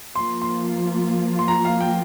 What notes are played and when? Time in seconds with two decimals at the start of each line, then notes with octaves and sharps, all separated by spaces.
0.15 F3 A#3 F4 C6
0.42 C6
1.39 C6
1.48 A#5
1.65 F5
1.80 G5